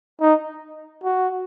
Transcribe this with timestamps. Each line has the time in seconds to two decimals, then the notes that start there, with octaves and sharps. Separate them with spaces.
0.21 D#4
1.04 F#4